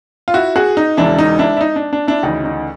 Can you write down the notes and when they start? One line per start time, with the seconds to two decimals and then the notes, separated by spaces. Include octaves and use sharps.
0.28 F4
0.34 E4 F#4
0.56 F#4 G#4
0.77 D#4
0.97 E1 E2 C#3 E3 D4 E4
1.19 D#4
1.39 D4 E4
1.57 E4
1.61 D#4
1.76 D4
1.93 D4
2.07 D4 E4
2.23 D2 C#3 E3 D#4
2.44 D#4